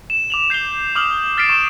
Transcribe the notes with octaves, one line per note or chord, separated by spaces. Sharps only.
E7
D6 F7 F#7
G6 C7 E7 F7 G7
D6 D#6 F6 E7 F#7
F6 A6 B6 C7 D7 E7
C#6 E7